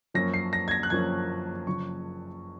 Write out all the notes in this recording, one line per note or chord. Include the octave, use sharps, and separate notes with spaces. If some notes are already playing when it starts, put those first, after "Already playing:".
F#2 F3 A#3 C#4 A#6
C7
A#6
G#6
A#6
F#6
F#2 F3 A#3 C#4 G#6
F#1 F#2 C#3 F3 C#6